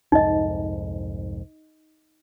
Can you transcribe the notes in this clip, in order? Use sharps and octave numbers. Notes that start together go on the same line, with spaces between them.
C2 F2 G#2 D#4 D#5